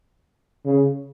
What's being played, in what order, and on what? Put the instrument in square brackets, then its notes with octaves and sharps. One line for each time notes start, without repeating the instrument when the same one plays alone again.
[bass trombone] C#3